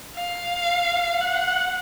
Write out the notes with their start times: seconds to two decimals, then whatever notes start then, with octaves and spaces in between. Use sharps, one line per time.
0.15 F5
1.21 F#5